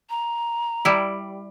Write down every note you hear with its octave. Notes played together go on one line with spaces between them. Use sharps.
A#5
G3 E4